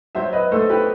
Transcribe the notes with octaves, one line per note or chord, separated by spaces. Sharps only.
F#3 C5 E5
B4 D#5
A3 A4 C5
G4 B4